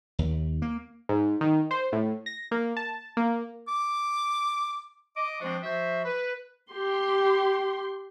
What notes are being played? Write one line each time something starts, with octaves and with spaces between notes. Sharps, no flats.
D#2
A#3
G#2
D#3
C5
A2
A#6
A#3
A5
A#3
D6
D#5 D6
F3 G#3 C4 D4 F#4 C5
F3 F#4 C5 E5
B4
G4 C6